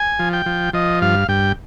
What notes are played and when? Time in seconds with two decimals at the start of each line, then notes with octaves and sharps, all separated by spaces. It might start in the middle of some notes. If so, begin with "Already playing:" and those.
Already playing: G#5
0.19 F3
0.33 G5
0.46 F3
0.73 F3 D#5
1.01 G2 F5
1.28 G2 G5